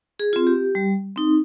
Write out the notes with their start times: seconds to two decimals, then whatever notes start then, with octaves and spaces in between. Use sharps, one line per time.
0.20 G#4
0.33 C4 F4
0.47 G4
0.75 G3
1.16 C4 D#4